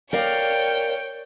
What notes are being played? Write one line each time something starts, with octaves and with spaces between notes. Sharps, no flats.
A#4 C#5 D5 F5 G5